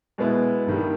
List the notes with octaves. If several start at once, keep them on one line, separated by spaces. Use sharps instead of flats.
B2 G#3 B3 E4
G2 D#3 G3